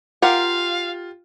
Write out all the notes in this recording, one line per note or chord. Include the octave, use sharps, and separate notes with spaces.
F4 G4 A#4 F5 F#5